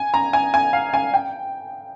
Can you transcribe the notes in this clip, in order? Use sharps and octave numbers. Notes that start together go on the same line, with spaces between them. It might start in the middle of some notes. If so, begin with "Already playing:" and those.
Already playing: G#5
A#5
G#5
G#5
F5
G#5
G5